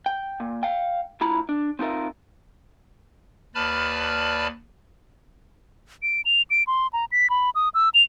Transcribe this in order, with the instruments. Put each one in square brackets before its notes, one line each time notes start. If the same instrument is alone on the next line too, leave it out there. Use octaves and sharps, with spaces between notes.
[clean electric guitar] G5
A#2
F5 G5
D2 E4 F4 A#5 B5
D4
C4 D#4 F4 A#4 E5
[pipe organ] D#2 B4 D5 A5 B5 F6
[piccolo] D7
F7
D7
C6
A#5
B6
B5
D#6
E6
F7